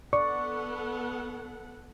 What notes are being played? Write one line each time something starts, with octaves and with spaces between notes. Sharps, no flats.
B3 A4 D5 F#5 C#6